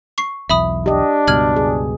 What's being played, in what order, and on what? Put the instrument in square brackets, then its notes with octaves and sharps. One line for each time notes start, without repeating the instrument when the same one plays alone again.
[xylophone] C#6 C7
[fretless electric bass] B1 E2 [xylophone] E5 B5 D#6
[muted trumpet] D4 [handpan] G4 D#5
[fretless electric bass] C#2 G2 B2 [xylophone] F6 G#6 F#7
[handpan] G#4